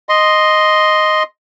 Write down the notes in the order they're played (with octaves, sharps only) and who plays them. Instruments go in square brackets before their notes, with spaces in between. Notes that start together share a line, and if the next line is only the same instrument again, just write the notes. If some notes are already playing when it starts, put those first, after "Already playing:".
[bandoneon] D#5 C6